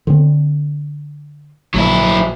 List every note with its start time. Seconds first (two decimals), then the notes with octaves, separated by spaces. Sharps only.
0.07 D3 C4
1.74 A#1 F#3 E4